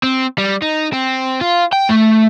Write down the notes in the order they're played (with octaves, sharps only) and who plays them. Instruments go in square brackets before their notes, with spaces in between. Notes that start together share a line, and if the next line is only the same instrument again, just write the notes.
[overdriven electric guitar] C4
G3
D#4
C4
F4
G5
A3